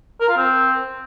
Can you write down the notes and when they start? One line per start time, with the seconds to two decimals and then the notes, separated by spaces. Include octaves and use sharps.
0.20 A#4
0.29 F4
0.37 C4